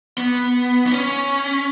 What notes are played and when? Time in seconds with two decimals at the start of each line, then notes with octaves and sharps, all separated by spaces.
0.18 B3
0.86 B3
0.92 C#4